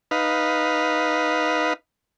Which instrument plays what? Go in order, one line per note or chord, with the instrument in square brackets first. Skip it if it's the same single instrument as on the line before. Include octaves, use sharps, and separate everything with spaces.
[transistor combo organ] D#4 B4 F5